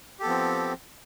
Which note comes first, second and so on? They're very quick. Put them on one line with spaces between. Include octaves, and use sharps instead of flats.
G4 A4 B3 F3 C4